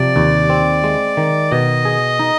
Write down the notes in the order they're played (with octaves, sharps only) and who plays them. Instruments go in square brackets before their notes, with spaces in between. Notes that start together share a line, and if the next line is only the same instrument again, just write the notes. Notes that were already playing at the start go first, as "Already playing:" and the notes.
Already playing: [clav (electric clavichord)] C3 F3 [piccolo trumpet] D5
[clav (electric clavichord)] D#2
C4
G#3
D#3
[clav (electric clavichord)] B2 [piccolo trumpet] D#5
[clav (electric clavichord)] G#4
D#4